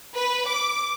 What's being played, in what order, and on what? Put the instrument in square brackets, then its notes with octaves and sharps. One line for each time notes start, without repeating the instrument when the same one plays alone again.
[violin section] B4
D6